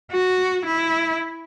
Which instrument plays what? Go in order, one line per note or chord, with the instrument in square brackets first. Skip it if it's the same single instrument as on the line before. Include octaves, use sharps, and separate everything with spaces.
[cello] F#4
E4